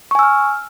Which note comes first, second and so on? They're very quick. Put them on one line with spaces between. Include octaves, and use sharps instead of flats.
C#6 G#5 E6 F6